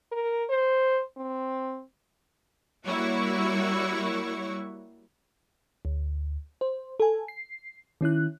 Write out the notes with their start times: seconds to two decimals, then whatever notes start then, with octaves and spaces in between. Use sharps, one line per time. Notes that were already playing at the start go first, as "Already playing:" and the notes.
0.12 A#4
0.49 C5
1.17 C4
2.86 G3 A#3 E4 F#4 C#5 C#6
5.85 D2
6.61 C5
7.00 A4 G#5
7.28 C7
8.01 D#3 C#4 E4 F#6